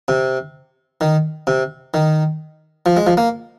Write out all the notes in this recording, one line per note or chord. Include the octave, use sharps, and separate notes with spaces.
C3
D#3
C3
D#3
F3
G#3
F3
A#3